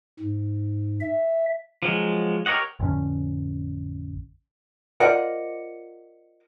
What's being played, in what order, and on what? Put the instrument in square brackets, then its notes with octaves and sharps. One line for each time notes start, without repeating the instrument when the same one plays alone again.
[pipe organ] G#2
E5
[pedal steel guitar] F3 F#3 G#3
G4 A#4 C#5 D#5 F#5
[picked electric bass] A1 F2 D3 C#4
[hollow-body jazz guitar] F4 A#4 C5 D5 D#5 F#5